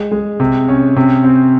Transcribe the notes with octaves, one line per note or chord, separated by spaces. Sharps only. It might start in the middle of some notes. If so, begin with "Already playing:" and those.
Already playing: G#3
G#3
C3
C#4
C3
C4